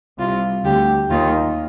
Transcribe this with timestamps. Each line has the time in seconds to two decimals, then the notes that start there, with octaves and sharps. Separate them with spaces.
0.19 C2 C3 F4
0.64 D2 D3 G4
1.11 D#2 D#3 F4